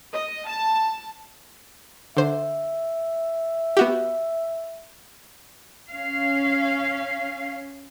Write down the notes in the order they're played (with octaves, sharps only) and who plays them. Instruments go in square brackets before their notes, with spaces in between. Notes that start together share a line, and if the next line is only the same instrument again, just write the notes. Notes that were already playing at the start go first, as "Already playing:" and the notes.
[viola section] D#5
A5
[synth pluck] D3 C5 [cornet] E5
[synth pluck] B3 F#4 G4
[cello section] C#4 F5